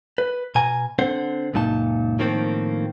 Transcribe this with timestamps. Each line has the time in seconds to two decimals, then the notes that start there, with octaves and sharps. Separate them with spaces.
0.18 B4
0.55 B2 G#5 A#5
0.99 D3 C4 C5 F#5
1.53 C#2 F#2 A#2 D#4 A5
2.19 A2 D#3 F3 A#3 C4